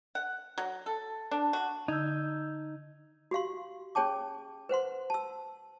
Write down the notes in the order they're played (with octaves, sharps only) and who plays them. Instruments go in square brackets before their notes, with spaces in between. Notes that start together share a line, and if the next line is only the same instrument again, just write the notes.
[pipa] F#5
F#3
A4
D4
F#4
[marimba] D3 [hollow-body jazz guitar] D#4 [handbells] E6 G6 G#6
[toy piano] F#4 G4 F5 C6
C#4 G#4 C#5 G5 A5 D6
B4 C5 F#5 C6
A5 E6